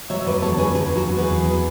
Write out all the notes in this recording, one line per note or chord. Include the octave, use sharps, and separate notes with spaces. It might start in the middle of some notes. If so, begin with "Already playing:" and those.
F#3 C#5 E5
B4 D5
E2
A4 C#5
D3
G#4 B4
E2 G#4 B4
F#3 F#4
E2 G#4 B4
B3